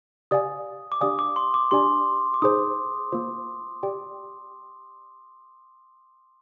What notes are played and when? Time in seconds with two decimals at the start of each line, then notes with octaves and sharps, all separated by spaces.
0.31 G4 D5 F5 G#5 D#6
0.92 D6
1.01 D4 G4 D5 F5 G#5 D#6
1.19 D6
1.36 C6
1.54 D6
1.71 D4 G4 D5 G#5 C6
2.34 D6
2.42 D#4 G#4 C5 D#6
3.12 A#3 F4 C5
3.83 G4 D5 G5